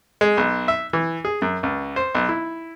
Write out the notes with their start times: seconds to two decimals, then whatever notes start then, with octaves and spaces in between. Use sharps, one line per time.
0.21 G#3
0.37 B1
0.68 E5
0.93 E3
1.25 G#4
1.42 F#2
1.63 C#2
1.96 C5
2.15 B1
2.29 E4